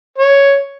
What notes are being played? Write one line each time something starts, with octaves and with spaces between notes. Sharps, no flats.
C#5